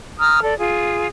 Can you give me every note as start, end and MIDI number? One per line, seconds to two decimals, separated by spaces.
0.19 0.40 82
0.19 0.40 87
0.19 0.40 89
0.41 0.57 69
0.41 0.57 74
0.58 1.08 65
0.58 1.08 68